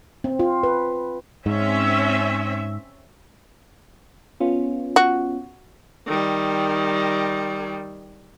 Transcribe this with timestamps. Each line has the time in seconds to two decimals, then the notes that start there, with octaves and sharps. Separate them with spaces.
0.24 C4
0.39 F4
0.63 B4
1.46 G#2 C4 C#4 E5
4.40 B3 C#4 F4
4.96 F#4
6.07 D#3 G3